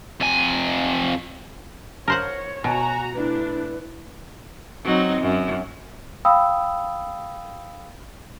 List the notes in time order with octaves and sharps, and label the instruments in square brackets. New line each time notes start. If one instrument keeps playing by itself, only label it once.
[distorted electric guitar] F2 G#5
[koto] A#4 C5 F#5 [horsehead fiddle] C#5
[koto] B2 [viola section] F#4 A#5 [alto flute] G#5
[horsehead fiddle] A3 E4 [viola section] D4 [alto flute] B4
[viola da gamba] F#3 C4 D#4
F#2
[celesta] F5 G5 B5 D#6 E6